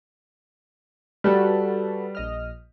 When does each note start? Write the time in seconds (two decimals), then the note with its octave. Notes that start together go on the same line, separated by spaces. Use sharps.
1.24 G3 F#4 A4 B4
2.15 A#1 D#5 F6